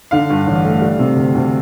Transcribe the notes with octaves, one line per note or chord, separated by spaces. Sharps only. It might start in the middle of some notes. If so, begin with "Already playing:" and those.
D3 F5
G2
A1
A3
G3
C3
D2
D2